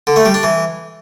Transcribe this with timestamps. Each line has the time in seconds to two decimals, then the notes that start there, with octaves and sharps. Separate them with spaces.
0.07 D3
0.16 A3
0.25 G3
0.34 D4
0.43 E3